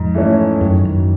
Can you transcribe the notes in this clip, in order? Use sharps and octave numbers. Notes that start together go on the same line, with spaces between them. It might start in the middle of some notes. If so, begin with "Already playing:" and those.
Already playing: F2 G#2
E3 A3 C#4
F#2 D#3
F#2